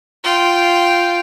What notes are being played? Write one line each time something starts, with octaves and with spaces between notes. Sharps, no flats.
F4 G5